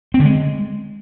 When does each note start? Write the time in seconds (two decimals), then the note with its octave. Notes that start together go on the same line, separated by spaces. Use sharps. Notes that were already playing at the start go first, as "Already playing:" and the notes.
0.14 C4
0.20 D3
0.25 G#3